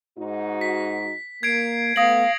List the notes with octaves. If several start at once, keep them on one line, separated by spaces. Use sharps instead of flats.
G#2 D#4 F#4
B6
A#3 G#6 C7 D7
A3 B3 F5 D#6 A#6 F#7